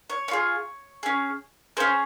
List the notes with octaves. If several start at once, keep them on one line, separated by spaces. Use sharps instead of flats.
C#5
C#4
F4 G#4
C#4 G#4
C#4 G#4 C5